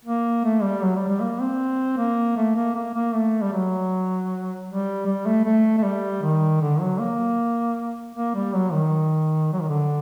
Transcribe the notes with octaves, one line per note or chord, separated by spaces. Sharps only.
A#3
A3
G3
F#3
G3
G3
A#3
C4
A#3
A3
A#3
A#3
A#3
A3
G3
F#3
G3
G3
A3
A3
A3
G3
D#3
D3
F#3
A#3
A#3
G3
F#3
D#3
F#3
D#3
D3